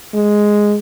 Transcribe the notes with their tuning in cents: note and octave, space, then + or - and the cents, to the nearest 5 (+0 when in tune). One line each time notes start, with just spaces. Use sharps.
G#3 +0